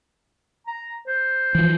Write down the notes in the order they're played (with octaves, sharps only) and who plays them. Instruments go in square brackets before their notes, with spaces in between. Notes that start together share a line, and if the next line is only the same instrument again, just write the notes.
[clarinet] A#5
C5
[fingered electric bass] E3 F3